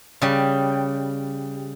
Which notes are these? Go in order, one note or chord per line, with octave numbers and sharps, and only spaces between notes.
C#3 G3